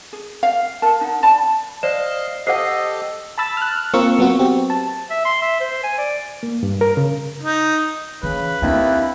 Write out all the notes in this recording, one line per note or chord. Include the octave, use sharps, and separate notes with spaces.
G#4
F5
A#4 A5
D#4 F#5
D5 A5 B5
C5 D5 D#5 F5 E7
G4 A4 C5 D#5 F#5 C7
A5 B5 E6 A6
F6 F#6
A#3 C4 F4 A#4 C#6 E6
F#3 B3 C4 F#4
C4 G4
A5
E5
C6
E5
C5
G#5
D5
A#3
G2
A#4
C#3
D#4
C#3 E3 B4
D#2 C4 D4 E4